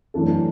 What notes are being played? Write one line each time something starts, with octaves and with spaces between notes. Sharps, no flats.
F#2 E3 A3 D4 A4